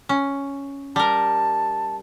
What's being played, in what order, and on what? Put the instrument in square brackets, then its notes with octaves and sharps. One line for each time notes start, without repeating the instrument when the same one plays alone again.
[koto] C#4
[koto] G3 A#4 [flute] A5